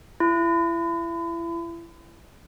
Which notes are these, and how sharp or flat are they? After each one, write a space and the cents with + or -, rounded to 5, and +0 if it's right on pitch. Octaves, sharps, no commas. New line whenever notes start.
E4 +35